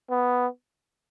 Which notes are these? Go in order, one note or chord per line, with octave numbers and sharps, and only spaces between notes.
B3